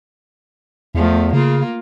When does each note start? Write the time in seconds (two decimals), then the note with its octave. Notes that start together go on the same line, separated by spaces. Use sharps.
0.95 E2 F3 A3
1.33 C#3 A#3 F4